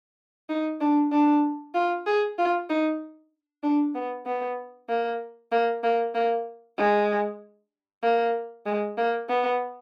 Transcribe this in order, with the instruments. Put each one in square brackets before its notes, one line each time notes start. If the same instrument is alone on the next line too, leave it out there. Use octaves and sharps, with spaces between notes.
[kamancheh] D#4
D4
D4
F4
G#4
F4
D#4
D4
B3
B3
A#3
A#3
A#3
A#3
G#3
A#3
G#3
A#3
B3